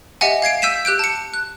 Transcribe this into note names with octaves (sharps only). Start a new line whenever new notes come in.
G4 D#5 E5 F#5 G#5
F5 G#6 C7 D7
E6 G6 B6 D#7 E7
G4 F#6 G6 D7
A5 C#7
F#6